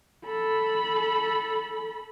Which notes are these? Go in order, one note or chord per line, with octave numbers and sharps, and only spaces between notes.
A4 B5